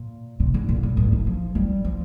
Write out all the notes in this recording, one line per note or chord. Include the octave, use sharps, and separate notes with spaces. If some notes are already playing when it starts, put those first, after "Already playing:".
Already playing: A#2
C3
D3
A#2
A2
G2
D#3
F3
G3
F3